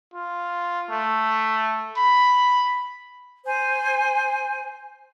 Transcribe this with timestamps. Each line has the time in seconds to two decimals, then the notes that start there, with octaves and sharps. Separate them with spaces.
0.14 F4
0.90 A3
1.97 B5
3.43 C5 G#5